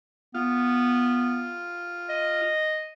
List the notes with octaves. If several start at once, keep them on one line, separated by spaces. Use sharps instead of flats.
B3 F4
D#5